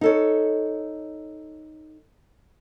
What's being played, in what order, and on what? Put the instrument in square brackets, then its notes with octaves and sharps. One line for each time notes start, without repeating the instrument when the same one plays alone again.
[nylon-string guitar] D#4 A4 C#5